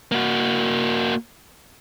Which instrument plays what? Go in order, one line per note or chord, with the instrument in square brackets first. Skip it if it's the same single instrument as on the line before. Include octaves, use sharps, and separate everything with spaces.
[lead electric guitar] A#3 F#4